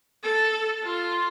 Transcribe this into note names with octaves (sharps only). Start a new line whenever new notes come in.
A4
F4